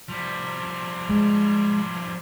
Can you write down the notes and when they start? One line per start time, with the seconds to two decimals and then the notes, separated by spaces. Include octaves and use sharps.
0.09 F3 G3
1.09 G#3